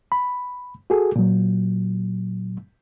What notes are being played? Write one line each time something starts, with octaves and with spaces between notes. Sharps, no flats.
B5
F#4 G#4 A4
A#2 F#3